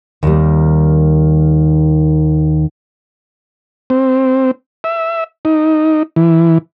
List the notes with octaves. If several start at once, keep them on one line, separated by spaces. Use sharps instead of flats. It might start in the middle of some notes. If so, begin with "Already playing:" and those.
D#2 D#3 G3
C4
E5
D#4
E3